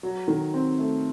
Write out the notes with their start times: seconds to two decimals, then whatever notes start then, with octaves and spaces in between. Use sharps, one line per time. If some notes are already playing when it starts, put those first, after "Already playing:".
0.03 F#3
0.28 D#3
0.54 C4
0.79 A3